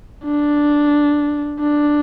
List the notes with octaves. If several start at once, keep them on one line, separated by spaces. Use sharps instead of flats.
D4
D4